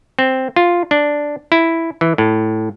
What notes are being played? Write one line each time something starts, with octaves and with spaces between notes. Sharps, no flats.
C4
F4
D4
E4
E3
A2